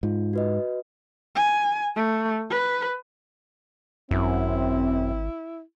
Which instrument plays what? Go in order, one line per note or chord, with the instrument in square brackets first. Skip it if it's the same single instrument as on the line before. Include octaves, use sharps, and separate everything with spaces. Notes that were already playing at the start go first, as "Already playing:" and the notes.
[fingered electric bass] G#2 [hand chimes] F4
[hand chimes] F#4 B4 D#5
[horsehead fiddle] G#5
A3
B4
[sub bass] G#1 [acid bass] F#2 [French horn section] C4 [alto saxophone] E4